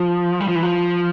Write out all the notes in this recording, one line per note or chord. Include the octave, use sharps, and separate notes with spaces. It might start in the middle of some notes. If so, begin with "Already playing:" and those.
Already playing: F3
G3
F3
E3
F3